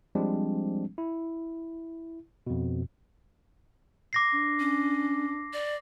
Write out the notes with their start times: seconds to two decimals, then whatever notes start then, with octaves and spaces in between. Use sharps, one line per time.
0.15 F3 G3 G#3 C4 D4
0.98 E4
2.47 F2 B2
4.13 D6 A#6 C7
4.34 D4
4.59 C#4
5.53 D5